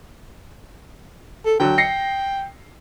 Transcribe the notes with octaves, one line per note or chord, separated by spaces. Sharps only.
A4
D3 F#3 G5
A#6 C7 C#7